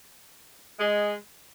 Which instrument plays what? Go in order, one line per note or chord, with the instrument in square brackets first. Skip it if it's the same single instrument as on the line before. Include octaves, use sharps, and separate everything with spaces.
[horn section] G#3